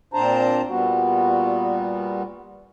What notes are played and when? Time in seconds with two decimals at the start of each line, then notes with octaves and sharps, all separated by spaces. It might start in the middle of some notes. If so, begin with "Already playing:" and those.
0.14 A#2 C4 D4 C5 A5 A#5
0.69 A#2 G3 B3 F#4